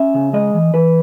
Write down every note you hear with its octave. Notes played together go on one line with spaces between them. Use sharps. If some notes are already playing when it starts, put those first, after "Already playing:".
Already playing: C#4 E5
C#3
G#3 D#5
E3
E3 B4